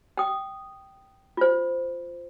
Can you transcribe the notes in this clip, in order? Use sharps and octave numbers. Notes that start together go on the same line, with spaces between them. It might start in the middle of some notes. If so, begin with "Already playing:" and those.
G5 D#6
F4 C5